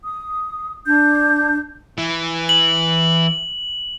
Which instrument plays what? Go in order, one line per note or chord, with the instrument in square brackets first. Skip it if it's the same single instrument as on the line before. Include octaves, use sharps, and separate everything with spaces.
[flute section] D#6
D4 G6
[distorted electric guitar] E3
[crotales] F#7